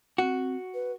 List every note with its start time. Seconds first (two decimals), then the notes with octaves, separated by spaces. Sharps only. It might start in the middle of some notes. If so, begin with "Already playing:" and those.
0.18 C4 F#4
0.74 B4